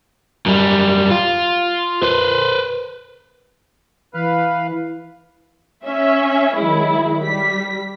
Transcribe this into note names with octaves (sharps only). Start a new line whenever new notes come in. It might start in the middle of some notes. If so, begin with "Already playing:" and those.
F#2 G3
F4
B4 C5
E3 B4 F5
C#4 E5
D#3 F#3 G#3 E4
G3 B6